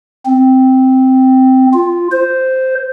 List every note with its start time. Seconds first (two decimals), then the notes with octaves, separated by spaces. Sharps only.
0.26 C4
1.74 F4
2.12 C5